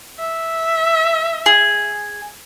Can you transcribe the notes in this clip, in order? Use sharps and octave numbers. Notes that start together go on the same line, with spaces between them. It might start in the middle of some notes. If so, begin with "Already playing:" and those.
E5
G#4